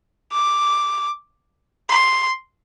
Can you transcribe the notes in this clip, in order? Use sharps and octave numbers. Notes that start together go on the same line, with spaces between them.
D6
C6